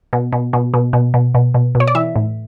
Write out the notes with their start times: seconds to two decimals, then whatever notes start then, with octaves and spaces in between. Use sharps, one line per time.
0.13 B2
0.33 B2
0.53 B2
0.74 B2
0.93 B2
1.14 B2
1.35 B2
1.54 B2
1.75 B2
1.80 C#5
1.87 D5
1.95 E3 E5
2.16 A2